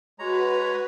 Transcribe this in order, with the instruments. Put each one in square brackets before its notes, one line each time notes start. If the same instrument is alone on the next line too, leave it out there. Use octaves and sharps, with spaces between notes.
[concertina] G#3 C#5 A#5 [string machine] F#4 B4